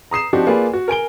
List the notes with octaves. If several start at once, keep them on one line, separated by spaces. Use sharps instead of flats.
A#5 D#6 C7 E7
F3 C4 D4 D#4 F#4 G4
A#3 F4 G#4 B4 D5
F#4
A#4 G#5 D7 G7